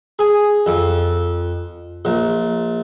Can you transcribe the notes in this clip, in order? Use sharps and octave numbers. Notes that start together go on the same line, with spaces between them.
G#4
F2
A#1